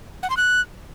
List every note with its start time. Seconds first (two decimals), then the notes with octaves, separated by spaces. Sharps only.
0.23 F#5
0.30 C6
0.37 F#6